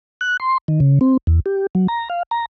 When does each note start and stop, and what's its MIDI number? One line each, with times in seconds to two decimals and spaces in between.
0.21 0.37 90
0.40 0.58 84
0.68 0.80 51
0.80 0.99 49
1.01 1.17 60
1.27 1.40 40
1.46 1.66 67
1.75 1.87 54
1.88 2.08 82
2.10 2.23 77
2.31 2.46 82